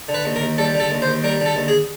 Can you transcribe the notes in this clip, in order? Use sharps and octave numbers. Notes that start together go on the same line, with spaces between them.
D3
B4
D#2
A#4
D#2
G3 A4
D3
A4
D#2
C5
D#2
G3 A#4
D3
A4
D#2
G#4